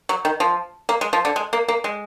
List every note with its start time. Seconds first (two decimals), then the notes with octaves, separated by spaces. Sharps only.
0.09 F#3
0.25 D#3
0.40 F3
0.89 A#3
1.01 G#3
1.13 F3
1.25 D3
1.36 G#3
1.53 A#3
1.68 A#3
1.84 G#3